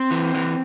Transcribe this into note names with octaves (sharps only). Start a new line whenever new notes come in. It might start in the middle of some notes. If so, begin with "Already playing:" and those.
Already playing: C4
E3
E3